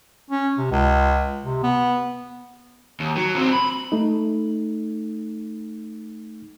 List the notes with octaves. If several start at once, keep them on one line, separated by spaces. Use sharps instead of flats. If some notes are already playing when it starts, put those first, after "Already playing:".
C#4
C3
C#2
C3
B3
D#2
F#3
F#3 C4
B5
A3 D#4